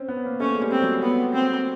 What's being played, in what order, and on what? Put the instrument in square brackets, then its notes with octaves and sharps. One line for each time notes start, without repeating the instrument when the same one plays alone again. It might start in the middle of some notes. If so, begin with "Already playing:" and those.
Already playing: [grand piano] C4 C#4
B3
A#3
[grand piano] A3 [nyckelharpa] C#4
[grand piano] G#3
G3
[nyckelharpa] C4
[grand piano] F#3
[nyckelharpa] B3
C4